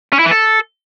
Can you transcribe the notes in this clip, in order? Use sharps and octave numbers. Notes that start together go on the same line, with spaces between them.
C#4
E4
E3
A4